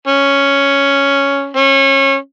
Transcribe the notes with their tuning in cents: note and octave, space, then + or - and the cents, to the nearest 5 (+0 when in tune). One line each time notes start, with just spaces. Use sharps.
C#4 +5
C#4 -25